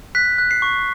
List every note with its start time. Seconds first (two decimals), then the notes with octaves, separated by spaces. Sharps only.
0.15 F#6 B6
0.38 F#6
0.51 C7
0.62 C#6